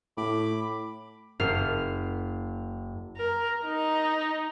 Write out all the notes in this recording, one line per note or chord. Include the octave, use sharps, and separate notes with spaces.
A2 B5 D6
F#1 F6 C7
A#4
D#4